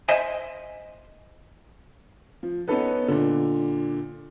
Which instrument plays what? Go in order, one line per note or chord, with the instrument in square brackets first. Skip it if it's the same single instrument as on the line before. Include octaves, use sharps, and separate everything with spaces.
[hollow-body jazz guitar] C5 D#5 E5 G#5
[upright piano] F3
B3 C#4 D#4 A4 B4
A#2 D3